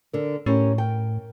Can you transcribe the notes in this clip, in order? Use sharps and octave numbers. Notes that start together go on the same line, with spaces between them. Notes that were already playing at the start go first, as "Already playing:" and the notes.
D3 A#4
A2 C#4 G4 A#4
A#4 G5